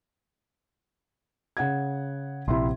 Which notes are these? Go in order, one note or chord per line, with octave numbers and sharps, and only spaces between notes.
C#3 F#5 G#6
A#1 C3 E4 E5 C6